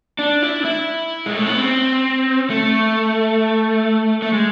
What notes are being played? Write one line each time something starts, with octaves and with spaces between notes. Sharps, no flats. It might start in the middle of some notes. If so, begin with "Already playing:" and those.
D4
E4
D4
E4
G#3
A3
B3
C4
A3
A3
G#3